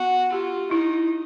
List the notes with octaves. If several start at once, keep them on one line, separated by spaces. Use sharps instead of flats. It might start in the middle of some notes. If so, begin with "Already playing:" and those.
Already playing: B3 F#4
F4 G4
D#4 E4